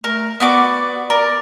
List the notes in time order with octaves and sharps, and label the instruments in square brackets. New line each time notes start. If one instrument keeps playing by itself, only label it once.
[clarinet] A3 [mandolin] A#4
[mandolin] B3 F#4 D6 [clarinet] D5
[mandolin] A#4 [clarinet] D5